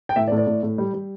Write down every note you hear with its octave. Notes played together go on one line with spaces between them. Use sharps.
G5
A2 E5
D5
A2
D5
A2
A2
G3
G3